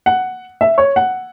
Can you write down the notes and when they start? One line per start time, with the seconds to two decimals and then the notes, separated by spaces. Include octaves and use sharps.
0.06 F#5
0.61 E5
0.78 C#5
0.96 F#5